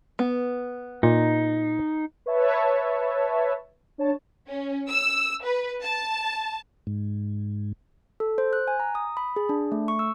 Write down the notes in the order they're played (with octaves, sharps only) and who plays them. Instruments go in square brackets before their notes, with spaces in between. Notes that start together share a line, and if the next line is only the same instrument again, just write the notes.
[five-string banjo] B3
[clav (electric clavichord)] A#2 [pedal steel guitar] D#4
[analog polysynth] B4 C#5 E5 A5
D4 C#5 A5
[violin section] C#4
E6
B4
A5
[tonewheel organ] G#2
[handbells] A4
C5
F#6
G#5
A#5
D#6
B5
G#4
D4
A3
C#6
E6